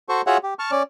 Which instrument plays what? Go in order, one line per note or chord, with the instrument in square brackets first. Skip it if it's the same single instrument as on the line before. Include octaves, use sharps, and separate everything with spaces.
[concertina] F#4 A4 C5 C#6
F4 F#4 G#4 C#5 E5 F#5
G4
A5 C#6 F6
C#4 D5